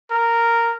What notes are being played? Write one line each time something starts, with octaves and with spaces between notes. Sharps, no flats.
A#4